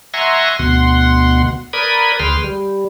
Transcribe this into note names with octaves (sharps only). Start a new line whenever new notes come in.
E5 F#5 G#5 A#5 C6 C#6
D2 B2 F#5 C6
A#4 B4 D5 B5 D#6 G#6
D2 G#4 B4 G5 C6 F6
G3